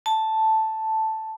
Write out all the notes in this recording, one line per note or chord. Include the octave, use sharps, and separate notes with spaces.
A5